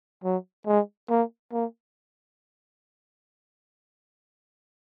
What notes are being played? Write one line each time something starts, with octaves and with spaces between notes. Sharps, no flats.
F#3
G#3
A#3
A#3